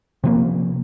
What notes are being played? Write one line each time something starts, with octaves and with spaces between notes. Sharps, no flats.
C3 F3 A#3